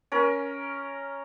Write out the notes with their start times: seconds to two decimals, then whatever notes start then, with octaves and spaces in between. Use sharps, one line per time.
0.12 C#4 A#4